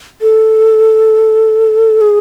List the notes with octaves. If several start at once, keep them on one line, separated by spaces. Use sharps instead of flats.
A4
G#4